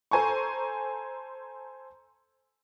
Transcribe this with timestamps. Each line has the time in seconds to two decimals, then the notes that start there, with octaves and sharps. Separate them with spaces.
0.11 A4 C5 G#5 A#5 C#6